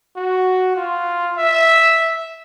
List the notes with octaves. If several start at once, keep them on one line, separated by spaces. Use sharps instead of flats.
F#4
F4
E5